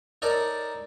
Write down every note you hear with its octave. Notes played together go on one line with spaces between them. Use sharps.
D#4 A4 A#4 C#5 D5